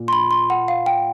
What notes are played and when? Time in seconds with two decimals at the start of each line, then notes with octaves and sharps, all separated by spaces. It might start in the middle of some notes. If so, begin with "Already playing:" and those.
Already playing: A#2
0.08 C6
0.13 B5
0.31 C6
0.50 F#5
0.68 F5
0.86 G5